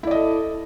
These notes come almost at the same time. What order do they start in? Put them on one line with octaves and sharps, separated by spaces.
E4 D5 D#5 A4